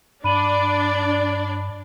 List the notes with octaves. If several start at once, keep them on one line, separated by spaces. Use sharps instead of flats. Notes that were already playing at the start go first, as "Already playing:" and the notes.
G2 D4 D5 B5 D#7 F#7